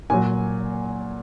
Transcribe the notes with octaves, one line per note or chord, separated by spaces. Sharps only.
A#2 F#3 G#5